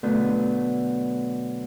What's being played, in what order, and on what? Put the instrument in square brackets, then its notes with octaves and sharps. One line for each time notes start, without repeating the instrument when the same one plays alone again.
[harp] B2 D3 F#3 A3 F#4